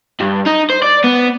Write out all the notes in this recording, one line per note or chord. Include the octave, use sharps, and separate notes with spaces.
G2
D#4
C5
D5
B3